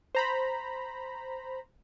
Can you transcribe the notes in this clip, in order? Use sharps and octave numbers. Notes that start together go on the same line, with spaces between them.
C5 A#5 B5